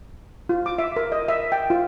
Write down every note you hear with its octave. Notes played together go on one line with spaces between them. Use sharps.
F4
D6
E5
A#4
D#5
E5
G5
F4